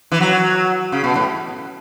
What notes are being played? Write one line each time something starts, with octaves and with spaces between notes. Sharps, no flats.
E3
F#3
C#3
B2
A2